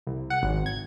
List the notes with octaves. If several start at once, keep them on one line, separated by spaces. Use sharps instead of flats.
C2
F#5
G#1
G#6